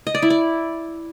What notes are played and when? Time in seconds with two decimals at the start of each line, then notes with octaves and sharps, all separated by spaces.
0.07 D#5
0.15 D5
0.22 E4
0.30 D5